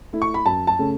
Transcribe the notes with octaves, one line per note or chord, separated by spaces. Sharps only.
A3 E4
C#6
B5
F#2 A5
A5
C#3 A3 C#4